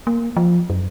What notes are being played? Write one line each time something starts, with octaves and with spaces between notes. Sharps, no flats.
A#3
F3
F#2